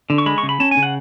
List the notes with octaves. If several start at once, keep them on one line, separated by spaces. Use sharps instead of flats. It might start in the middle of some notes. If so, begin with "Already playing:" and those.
D3
C#6
G#3 B5
C#6
C#3
B5
C#4 A5
G#5
C#3
F#5